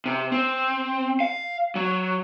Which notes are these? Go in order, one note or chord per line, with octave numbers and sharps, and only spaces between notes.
C3
C4
F5
F#3